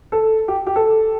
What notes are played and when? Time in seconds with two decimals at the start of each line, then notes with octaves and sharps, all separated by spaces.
0.12 A4
0.48 G4
0.67 G4
0.76 A4